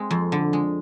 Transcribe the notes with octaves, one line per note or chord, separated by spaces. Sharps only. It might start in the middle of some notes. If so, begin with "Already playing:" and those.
Already playing: G#3 C4
F2
D3
G#3